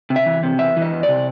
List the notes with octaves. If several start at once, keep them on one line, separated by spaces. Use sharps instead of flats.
C3
E5
E3
C3
E2 E5
E3 D#5
E2
D5
C3